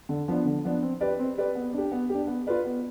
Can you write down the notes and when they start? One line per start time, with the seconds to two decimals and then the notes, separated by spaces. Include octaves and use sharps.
0.09 D3
0.28 F3 B3 D4
0.45 D3
0.65 F3 B3 D4
0.82 C4
1.01 G4 B4 D5
1.19 C4
1.38 G4 B4 D5
1.55 B3
1.73 D4 G4
1.92 B3
2.09 D4 G4
2.27 B3
2.47 F4 B4 D5
2.65 B3